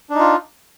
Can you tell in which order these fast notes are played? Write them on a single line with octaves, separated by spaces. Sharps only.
D4 D#4 F4